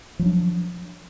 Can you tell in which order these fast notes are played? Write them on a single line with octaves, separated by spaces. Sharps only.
F3 F#3 D4